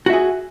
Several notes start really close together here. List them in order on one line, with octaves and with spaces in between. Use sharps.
F#4 E5 G#4